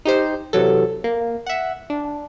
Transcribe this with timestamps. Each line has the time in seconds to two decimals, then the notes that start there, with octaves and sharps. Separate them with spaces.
0.05 D#4 G4 C5
0.53 C3 E3 F#3 A4
1.04 A#3
1.46 E5 F#5
1.90 D4